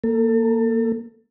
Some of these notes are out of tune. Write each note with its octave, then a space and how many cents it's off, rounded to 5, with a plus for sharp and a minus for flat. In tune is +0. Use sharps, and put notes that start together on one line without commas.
A#3 +0 A4 +30